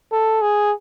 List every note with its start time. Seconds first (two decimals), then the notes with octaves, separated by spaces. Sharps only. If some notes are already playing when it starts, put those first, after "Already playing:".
0.12 A4
0.42 G#4